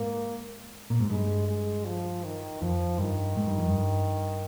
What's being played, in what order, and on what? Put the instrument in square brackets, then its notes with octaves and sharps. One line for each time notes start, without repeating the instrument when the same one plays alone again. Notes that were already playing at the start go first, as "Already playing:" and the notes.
Already playing: [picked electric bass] G#2 [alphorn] A#3
[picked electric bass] A#2
G#2
[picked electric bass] G2 [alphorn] G#3
[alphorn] G#3
F3
D#3
[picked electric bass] F2 [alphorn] F3
[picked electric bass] G2 [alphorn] D#3
[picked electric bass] G#2
G2
F2
G2